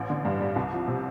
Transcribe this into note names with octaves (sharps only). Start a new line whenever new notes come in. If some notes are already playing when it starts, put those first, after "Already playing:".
Already playing: A1
D3
G2
G3
C2
F3
C3